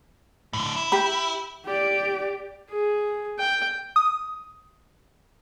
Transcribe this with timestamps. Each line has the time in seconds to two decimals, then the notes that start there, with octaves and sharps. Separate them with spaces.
0.53 A2 D3
0.76 E4
0.92 G4 B5
1.65 G4 D5
2.70 G#4
3.39 G5
3.96 D#6